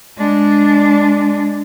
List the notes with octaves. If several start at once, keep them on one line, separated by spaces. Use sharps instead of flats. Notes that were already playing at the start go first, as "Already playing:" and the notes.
G#3 D4